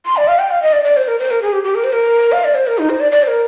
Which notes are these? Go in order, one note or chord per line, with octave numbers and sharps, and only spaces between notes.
C6
D5
F5
G5
F5
D#5
D5
D5
C5
A#4
C5
A#4
G#4
G4
G4
A#4
C5
A#4
F5
D5
C5
A#4
D#4
C5
D5
D5
C5
A#4